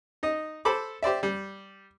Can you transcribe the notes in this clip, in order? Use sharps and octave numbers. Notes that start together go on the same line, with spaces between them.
D#4 D#5
A4 C5 B5 D6
G4 C5 D5 E5
G3